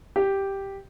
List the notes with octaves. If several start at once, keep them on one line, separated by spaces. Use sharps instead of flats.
G4